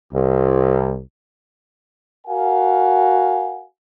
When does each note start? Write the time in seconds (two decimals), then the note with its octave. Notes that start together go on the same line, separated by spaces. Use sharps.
0.14 C2
2.27 F#4 A#4 F5 F#5 G#5